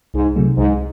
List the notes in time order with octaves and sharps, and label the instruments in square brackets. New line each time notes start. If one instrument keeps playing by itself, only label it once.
[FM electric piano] C2 [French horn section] G#2
[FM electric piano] C3 F#3 A3
[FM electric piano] C2 [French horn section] G#2